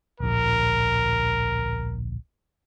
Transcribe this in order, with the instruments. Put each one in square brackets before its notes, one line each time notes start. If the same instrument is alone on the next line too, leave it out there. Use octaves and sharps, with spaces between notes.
[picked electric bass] D1 A#1 [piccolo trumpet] A#4